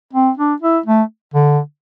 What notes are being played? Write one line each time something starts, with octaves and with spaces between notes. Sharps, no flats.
C4
D4
E4
A3
D3